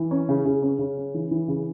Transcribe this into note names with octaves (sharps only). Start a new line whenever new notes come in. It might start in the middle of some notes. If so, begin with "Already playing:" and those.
Already playing: E3
C#4
C#3
C#3
C#4
C#3
C#4
E3
E3
C#3